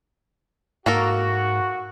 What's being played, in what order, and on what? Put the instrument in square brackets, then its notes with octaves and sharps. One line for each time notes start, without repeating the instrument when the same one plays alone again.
[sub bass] G#2 [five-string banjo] A#3 A4 A#4 [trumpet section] F#4